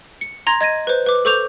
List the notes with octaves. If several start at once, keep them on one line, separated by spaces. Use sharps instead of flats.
C#7
A#5 C6 G#6 A#6
D#5 G#6 A#6 D#7
B4 C5
B4 D6
A4 C5 C#6 D6 G6 F7